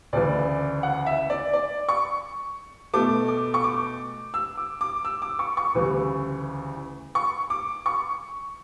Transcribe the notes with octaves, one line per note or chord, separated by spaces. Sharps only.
D2 C#3 E3 D5
F#5
E5
D5
D5
C#6
B2 A3 D6
D6
C#6
D6
E6
D6
D6
E6
D6
C#6
C#6
D2 C#3 E3 G3
C#6
D6
C#6